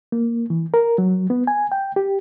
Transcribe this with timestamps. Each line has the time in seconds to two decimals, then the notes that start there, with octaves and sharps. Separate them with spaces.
0.12 A#3
0.50 E3
0.74 A#4
0.98 F#3
1.30 B3
1.47 G#5
1.72 G5
1.96 G4